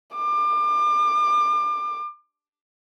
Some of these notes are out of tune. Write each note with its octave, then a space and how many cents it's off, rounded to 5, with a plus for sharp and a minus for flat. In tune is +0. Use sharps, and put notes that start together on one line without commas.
D6 +30